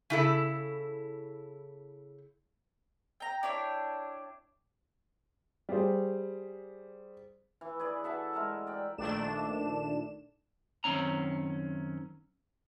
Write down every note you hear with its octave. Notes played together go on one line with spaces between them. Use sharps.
C#3 E4 A4
G5 A#5
D4 E4 C#5 G5
G3 G4 G#4 C5
E3
G#4 B4 D5
A4 E5 F#5 A5
G#3 A#4 E5
D5 G5
A#1 D#3 A3 D4 E7
F#2 D#3 C4 C#4 A#5